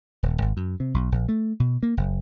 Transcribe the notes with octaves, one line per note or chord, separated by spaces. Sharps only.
D#1
G#1
F#2
C3
B1
A#1
A3
B2
A#3
F#1